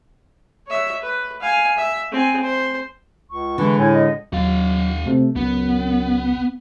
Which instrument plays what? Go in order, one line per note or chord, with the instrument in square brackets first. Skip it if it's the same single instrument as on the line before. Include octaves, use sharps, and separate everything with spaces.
[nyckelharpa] C#5 E5
B4
F5 G#5
E5
C4 G#5
C5
[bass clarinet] C#2 [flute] C#6
[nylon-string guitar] D3 G#3 [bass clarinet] E3
[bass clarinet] A2 [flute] G#5
[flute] D#5
[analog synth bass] D#2 [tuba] F#3 [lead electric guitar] F#4 F5
[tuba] C3 [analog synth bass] A3
[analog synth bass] C#2 [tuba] F#2 [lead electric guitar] B3